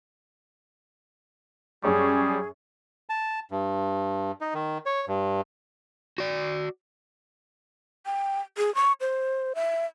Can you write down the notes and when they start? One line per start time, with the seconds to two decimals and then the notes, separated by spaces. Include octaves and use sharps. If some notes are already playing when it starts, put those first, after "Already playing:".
1.83 F#2 G3 C#4 G#4 C#6 D#6
3.09 A5
3.51 G2
4.41 D#4
4.54 D#3
4.86 C#5
5.08 G2
6.18 F#4 D5
8.06 G5
8.58 G#4
8.75 C#6
9.01 C5
9.55 E5